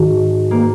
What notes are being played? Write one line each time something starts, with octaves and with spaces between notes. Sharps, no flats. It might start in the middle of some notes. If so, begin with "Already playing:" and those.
Already playing: G#2 D#3 F#3
A#3